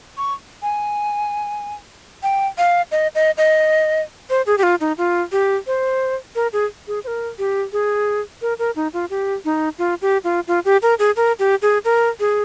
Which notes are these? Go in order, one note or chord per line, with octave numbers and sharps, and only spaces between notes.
C#6
G#5
G5
F5
D#5
D#5
D#5
C5
G#4
G4
F4
D#4
F4
G4
C5
A#4
G#4
G#4
C5
A#4
G4
G#4
A#4
A#4
D#4
F4
G4
D#4
F4
G4
F4
F4
G4
A#4
G#4
A#4
G4
G#4
A#4
G#4